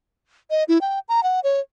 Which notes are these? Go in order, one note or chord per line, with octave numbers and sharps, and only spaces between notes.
D#5
E4
G5
A#5
F#5
C#5